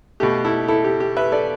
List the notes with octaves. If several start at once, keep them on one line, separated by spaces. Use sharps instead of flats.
B2 A3 G4
E4 A4
E4 A4
G4
G4
B4 E5
A4 D5